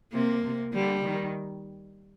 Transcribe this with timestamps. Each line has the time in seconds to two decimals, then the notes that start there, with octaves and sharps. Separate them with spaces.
0.13 C3 A#3
0.44 C3
0.74 D3 G3
1.05 D#3